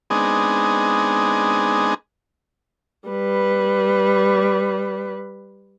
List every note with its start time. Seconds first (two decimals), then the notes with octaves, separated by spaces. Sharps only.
0.10 G#3 B3 C4 D4 D#4 G#4
3.08 G3 B4